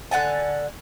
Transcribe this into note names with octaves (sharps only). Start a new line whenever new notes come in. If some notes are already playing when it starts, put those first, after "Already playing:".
D3 F#5 G#5 A5